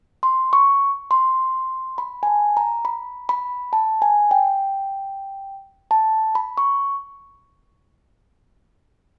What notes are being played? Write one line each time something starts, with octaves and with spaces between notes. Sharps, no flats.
C6
C#6
C6
B5
G#5
A5
A#5
B5
B5
A5
G#5
G5
A5
B5
C#6